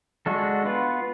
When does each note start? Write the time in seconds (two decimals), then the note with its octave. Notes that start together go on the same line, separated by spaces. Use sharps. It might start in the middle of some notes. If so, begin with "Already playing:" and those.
0.26 G#3 D4 F#4 A4
0.65 B3 F4 B4